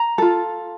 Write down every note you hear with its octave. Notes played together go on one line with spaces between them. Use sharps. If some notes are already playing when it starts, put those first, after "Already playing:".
Already playing: A#5
F4 A4